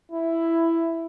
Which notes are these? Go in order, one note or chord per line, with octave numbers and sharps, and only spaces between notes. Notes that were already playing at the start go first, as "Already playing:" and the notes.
E4